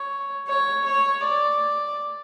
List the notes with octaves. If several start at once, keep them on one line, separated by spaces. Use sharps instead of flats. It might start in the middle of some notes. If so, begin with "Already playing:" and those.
Already playing: C#5
C#5
C#5
D5